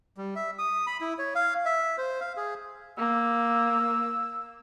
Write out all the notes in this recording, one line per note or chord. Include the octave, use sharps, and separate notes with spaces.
G3
E5
D#6
B5
E4
C#5
F5
E5
C5
F5
G#4
A#3 E6